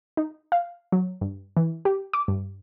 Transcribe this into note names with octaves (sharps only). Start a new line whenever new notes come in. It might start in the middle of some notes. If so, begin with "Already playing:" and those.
D#4
F5
F#3
G2
E3
G4
D6
G2